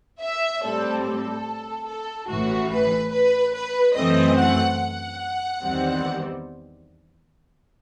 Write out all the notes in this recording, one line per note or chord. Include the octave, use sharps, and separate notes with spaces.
E5
A2 G3 C4 A4
A4
A4
A1 A2 E3 F#4
B4
B4
B4
F#2 E3 A3 C4 D#5
F#5
F#5
E2 D#3 G3 C4